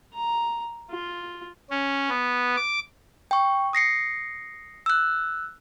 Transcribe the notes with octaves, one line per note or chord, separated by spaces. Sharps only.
A#5
F4
C#4
B3
D6
G5 C#6
D#6 A#6 C7 C#7
E6 F#6